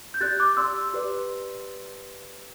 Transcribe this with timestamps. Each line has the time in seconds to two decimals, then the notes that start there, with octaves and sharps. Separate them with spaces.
0.14 G6
0.21 G4 D5 F#6 A6
0.39 D6 F#6
0.57 G4 D5 C6 E6
0.94 G4 B4 D5